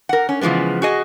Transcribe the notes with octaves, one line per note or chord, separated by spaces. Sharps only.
A#4 F#5
C#4
C#3 E3 F3 G#3 B3
F#4 G#4 D#5